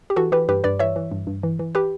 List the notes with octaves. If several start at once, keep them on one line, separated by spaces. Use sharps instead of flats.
G4
E3 F#4 A4
E3 G4 B4
G2 G4 B4
G2 B4 D5
E3 C#5 E5
E3
G2
G2
E3
E3
G4 B4